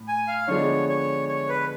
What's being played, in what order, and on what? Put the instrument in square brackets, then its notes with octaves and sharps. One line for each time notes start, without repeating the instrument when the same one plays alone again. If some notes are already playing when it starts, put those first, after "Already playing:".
Already playing: [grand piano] A2
[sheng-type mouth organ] G#5
F5
[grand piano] D3 F3 G#3 B3 D4 [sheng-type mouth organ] C#5
[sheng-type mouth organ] C#5
C#5
B4